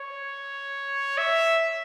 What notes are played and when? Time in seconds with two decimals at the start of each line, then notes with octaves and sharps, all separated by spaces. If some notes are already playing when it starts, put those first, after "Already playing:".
Already playing: C#5
1.18 E5